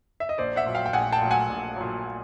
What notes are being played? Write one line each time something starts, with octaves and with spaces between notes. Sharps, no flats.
E5
D#5
A#1 C5 D5
E5 F#5
A#2 F#3
F5 G5
G5
A#1 F#5 G#5
G5 A5
A#2 F#3
F#5 G#5
A#1
A#2 F#3